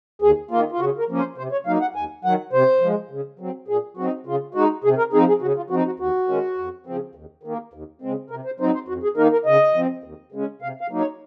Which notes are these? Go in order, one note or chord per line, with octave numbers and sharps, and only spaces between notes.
D#2 G#4
D#3 A#3 F4
F4
C#3 F#4
A#4
F3 A#3 C#4
C5
C3 C5
C#5
F#3 A#3 D#4 F5
F#5
D#2 G#5
D#3 F#3 F#5
C3 C5
F3 G#3
C#3
F#3 C4
A#2 G#4
F#3 C4 D#4 F#4
C#3 F4
G#3 D#4 F#4
C3 G#4
A#4
F3 C4 D#4 G#4
G#4
C#3 F#4
F4
F3 C4 D#4 F#4
F#4
D#2 F#4
D#3 G#3 C#4
F2
C#3 F3 C4
D#2
D#3 A#3
D#2
C#3 G#3 C4
C3 A#4
C5
F#3 C4 D#4 C5
C5
F2 F#4
G#4
D#3 A#3 D#4 A#4
A#4
C#3 D#5
F3 C4
D#2
C#3 G#3 C#4
C3 F5
F5
F#3 A#3 D#4
C#5